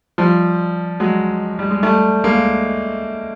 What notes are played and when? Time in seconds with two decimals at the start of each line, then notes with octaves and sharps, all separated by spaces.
0.18 F3 G3
1.00 F#3 G#3
1.59 G3
1.71 G#3
1.83 G3 A3
2.24 G#3 A#3